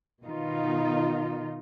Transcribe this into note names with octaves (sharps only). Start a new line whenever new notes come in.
B2 D#3 D#4 F4